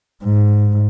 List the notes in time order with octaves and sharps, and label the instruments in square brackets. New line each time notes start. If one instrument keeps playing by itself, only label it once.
[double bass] G#2